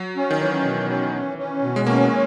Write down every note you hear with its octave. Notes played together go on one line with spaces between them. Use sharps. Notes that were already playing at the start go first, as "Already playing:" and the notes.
Already playing: F#3
C#4
D#3
E3 C#4
B2
C#4
C#4
C#4
B2
G#3
A#3 C#4